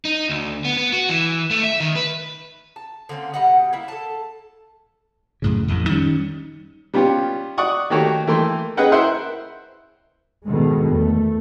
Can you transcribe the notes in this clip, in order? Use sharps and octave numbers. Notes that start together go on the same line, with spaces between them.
D#4
D2
B3
B3
F#4
E3
A3
E5
D#3
B4
A5
D3 A#3 C4 C#4
B2 G3 D#5 F#5
A#3 E4
A4 A5
F#2 A2 C#3
A1 F2
D#3 G3 C#4
G3 B3 C#4 F4 G4
D5 F#5 C#6 D#6
D#3 A3 A#3 F#4 G4 C#5
E3 A3 A#3 G5 C6
C#4 G#4 B4 D#5 F#5 G5
E4 A#4 C5 E5 F#5 C6
G#2 B2 D3 D#3 G#3
E2 A3